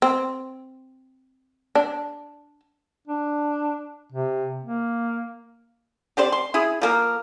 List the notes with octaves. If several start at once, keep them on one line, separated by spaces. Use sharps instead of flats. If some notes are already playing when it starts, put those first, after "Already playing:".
C4
D4
D4
C3
A#3
C4 G4 C5 D5
C6
E4 G#4
F3 A#3 A#4